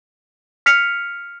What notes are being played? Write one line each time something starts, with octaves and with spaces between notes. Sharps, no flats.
F6 B6 C#7 F7